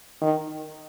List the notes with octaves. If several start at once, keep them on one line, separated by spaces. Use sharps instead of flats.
D#3